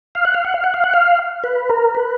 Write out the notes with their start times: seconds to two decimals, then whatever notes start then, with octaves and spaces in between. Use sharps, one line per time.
0.15 F5
0.25 F#5
0.34 F5
0.45 F#5
0.54 F5
0.64 F#5
0.74 F5
0.84 F#5
0.94 F5
1.44 B4
1.70 A#4
1.95 B4